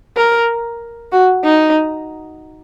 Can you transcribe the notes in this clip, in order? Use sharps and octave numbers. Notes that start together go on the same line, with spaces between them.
A#4
F#4
D#4